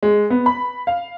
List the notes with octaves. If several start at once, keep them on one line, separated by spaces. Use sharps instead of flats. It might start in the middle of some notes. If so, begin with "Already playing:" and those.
G#3
B3
B5
F5